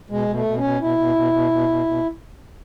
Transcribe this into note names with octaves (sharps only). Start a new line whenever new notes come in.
B2 G#3
B2
A3
B2
C#4
B2
B2 E4
B2
B2
B2
B2
B2
B2